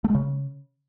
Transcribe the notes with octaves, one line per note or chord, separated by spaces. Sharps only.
A3
G#3
C#3